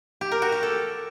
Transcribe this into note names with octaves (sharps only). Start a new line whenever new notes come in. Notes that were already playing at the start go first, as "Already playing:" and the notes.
G4
A#4
F#4
G4
A4